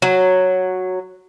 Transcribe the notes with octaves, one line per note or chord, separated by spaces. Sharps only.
F#3